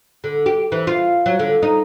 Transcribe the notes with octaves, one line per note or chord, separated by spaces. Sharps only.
D3
G4
E3
F4
F#3
D3
D#4